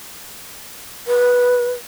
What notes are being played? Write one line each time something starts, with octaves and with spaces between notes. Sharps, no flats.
B4